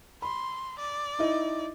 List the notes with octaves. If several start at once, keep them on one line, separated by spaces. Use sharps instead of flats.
B5 C6
D5
D#4 E4 D#5